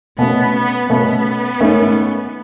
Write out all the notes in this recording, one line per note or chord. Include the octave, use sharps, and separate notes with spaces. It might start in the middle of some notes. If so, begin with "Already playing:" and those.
B2 A3 B3 C#4
B3
B2 A3 B3 C#4
G#2 D#3 A3 C#4